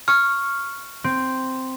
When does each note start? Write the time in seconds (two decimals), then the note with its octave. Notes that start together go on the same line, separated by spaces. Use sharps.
0.08 C#6 F6
1.04 C4